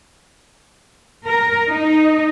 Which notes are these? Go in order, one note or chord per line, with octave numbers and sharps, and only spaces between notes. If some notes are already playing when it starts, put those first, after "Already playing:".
A#4
D#4